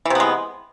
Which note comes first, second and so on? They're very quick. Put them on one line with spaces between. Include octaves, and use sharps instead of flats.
E3 C3 B3 G#3